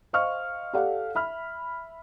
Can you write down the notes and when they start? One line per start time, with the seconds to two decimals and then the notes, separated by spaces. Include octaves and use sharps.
0.13 C5 D#5 F5 C#6 F6
0.73 G4 A4 D5 F5 F#5
1.15 E5 B5 F6